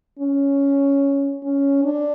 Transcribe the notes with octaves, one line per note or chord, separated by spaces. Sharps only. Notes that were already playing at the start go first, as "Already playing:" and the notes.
C#4
C#4
D4